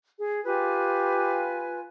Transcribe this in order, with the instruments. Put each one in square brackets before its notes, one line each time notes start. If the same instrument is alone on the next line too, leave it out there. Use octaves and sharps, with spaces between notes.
[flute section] G#4
[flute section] F4 B4 G#5 [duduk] G4